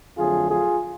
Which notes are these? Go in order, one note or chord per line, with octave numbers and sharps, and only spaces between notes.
F2 D3 F#3 A3 F4 G#4
F4 G#4